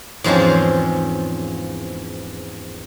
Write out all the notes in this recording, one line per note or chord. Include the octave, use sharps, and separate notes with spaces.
E2 G#2 F3 C4 C#4